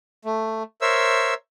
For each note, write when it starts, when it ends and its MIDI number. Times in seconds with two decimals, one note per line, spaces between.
0.25 0.63 57
0.81 1.34 70
0.81 1.34 72
0.81 1.34 73
0.81 1.34 76
0.81 1.34 88